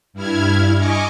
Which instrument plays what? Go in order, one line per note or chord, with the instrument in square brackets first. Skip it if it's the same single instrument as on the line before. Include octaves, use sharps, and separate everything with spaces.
[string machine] G2 E4 F6 G#6
D#5 G#5 C#6 D6